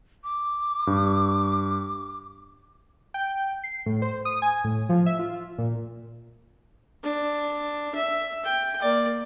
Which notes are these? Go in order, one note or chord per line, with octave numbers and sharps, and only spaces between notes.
D6
G2
G5
C7
A2
C5
D#6
G#5
A2
F3
E5
F4
A#2
D4
E5
G5
A#3 D5